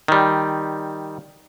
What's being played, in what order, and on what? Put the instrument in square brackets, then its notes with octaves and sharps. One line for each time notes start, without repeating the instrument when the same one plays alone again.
[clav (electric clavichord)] D#3 G3